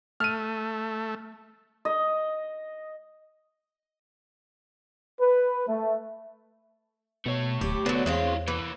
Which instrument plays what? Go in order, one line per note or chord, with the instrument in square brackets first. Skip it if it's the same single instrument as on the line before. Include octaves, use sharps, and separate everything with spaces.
[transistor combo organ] A3 [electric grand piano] F6 D#7
[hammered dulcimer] D#5
[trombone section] B4
A3
[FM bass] B2 [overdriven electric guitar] A3 C#5
[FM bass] D1 [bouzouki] G4
[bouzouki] D3 F#3 [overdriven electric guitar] A3 C5 [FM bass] B3
[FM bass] E2 [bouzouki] G#3 C4 C#5 [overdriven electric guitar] E4 F5
[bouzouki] E3 [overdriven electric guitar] A#3 B4